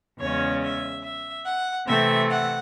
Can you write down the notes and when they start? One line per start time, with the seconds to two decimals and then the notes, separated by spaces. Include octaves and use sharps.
0.19 E2 C#3 G#3 C#4 C#5
0.61 E5
1.03 E5
1.44 F#5
1.86 C3 E3 A3 C4 E5
2.28 F#5